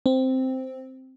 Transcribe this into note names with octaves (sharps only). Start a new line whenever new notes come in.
C4